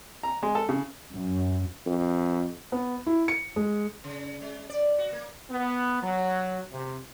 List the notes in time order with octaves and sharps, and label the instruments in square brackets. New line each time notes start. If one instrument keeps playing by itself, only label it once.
[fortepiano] A#5
G#3
A4
C#3
[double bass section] F#2
[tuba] F2
[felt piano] B3
E4
C#7
G#3
[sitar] C#3
G#3
D5
F#4
A#3
[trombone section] B3
F#3
C3